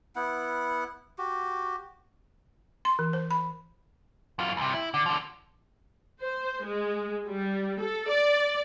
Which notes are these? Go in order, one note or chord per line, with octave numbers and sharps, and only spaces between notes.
B3 E4 F#5
F#4 G4
C6
E3
C5
B5
F#2 F4
C#2 C3
E4
D3
D3 F3
C5
G#3
G3
A4
D5